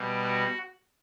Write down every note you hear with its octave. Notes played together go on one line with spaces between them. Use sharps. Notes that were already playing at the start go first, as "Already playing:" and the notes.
Already playing: B2 G3
F#4